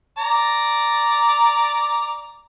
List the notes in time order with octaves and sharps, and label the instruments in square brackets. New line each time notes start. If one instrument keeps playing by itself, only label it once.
[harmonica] D5 A#5